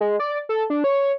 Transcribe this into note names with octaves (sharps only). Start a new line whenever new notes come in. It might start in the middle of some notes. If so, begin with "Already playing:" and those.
G#3
D5
A4
D4
C#5